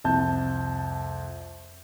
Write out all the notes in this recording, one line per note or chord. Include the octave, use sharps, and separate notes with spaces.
C2 F2 A5 G6